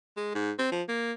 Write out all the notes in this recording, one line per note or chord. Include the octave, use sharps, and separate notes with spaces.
G#3
G#2
C4
F3
A#3